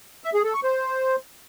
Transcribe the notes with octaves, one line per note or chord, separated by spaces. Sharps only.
E5
G#4
A4
C#6
C5